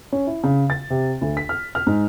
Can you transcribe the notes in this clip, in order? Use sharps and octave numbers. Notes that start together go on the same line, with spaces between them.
C#4
E4
C#3
A6
C3
D2
B6
F6
F6
G#2